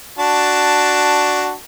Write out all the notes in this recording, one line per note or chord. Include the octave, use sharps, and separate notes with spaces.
D4 F#4 A5